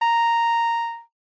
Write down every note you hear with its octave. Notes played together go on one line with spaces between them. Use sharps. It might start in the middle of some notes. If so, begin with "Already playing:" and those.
A#5